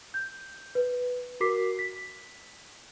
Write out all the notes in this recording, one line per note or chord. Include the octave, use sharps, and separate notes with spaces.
G6
B4
F#4 A#4 D6 B6 C7
B6